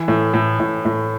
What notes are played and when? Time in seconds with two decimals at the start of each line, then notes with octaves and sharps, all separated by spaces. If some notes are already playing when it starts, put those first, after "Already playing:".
Already playing: E3
0.08 A2
0.34 A2
0.60 A2
0.85 A2